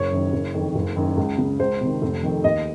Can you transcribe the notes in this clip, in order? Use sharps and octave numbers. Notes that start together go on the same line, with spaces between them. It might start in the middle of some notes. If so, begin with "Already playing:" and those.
Already playing: F#1 C#5
F#2 D#3
F#1
F2 D#3
F#1
F#2 D#3
C#2
C#3
C#2 C5
C3 D#3
F1
F2 C3 D#3
D#2 D#5